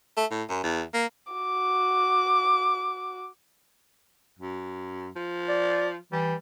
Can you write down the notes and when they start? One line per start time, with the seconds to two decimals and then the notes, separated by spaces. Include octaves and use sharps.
0.17 A3
0.31 A2
0.49 F#2
0.63 E2
0.94 A#3
1.33 F#4 D6
4.39 F#2
5.16 F3
5.49 D5
6.12 E3 G3